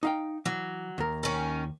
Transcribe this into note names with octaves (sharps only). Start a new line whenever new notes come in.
D#4 F5 G5
E3 F#3
D#2 A#4
D#3 C#4